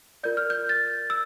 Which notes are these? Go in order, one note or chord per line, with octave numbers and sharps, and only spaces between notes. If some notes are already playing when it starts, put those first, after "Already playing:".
F4 A#4 D5 G6
F6
G6
A6
E6